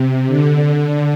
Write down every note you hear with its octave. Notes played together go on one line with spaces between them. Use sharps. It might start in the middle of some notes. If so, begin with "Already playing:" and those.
Already playing: C3
D3